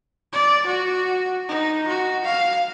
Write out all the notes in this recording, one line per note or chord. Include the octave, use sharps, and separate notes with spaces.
D5
F#4
D#4
F#4
F5